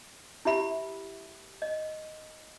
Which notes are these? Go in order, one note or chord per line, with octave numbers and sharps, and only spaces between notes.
E4 G4 E5 B5
D#5